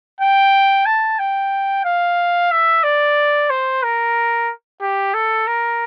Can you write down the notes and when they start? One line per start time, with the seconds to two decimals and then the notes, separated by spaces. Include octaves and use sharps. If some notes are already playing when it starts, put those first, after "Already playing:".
0.21 G5
0.86 A5
1.19 G5
1.85 F5
2.52 E5
2.83 D5
3.50 C5
3.83 A#4
4.82 G4
5.14 A4
5.47 A#4